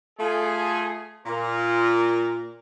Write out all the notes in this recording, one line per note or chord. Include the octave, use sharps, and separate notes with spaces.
A3 F4 G#4
A#2 A#4